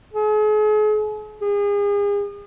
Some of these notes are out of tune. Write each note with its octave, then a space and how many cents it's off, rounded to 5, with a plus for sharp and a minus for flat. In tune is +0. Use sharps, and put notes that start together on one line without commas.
G#4 +40
G#4 -35